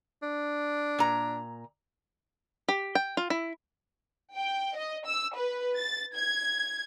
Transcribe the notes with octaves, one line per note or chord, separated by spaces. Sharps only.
D4
A#2 A#5
G4
G5
F4
E4
G5
D#5
E6
B4
A6
G#6